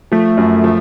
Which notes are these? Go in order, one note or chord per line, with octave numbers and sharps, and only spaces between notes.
F3 A3
F#2
F3